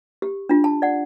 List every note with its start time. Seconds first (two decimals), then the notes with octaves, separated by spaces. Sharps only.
0.22 G4
0.49 D4 F4
0.64 A5
0.82 D5 F#5